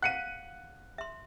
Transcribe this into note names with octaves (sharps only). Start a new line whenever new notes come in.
F5 F#5 F#6 C#7 D#7
E5 C6